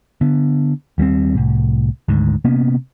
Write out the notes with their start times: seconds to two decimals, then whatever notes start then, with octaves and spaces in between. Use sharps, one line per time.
0.21 D3 B3
0.98 D#2 G3 B3 C4
1.34 C2 A2
2.08 G#1 D2 G#2
2.45 C3 A#3 B3 C#4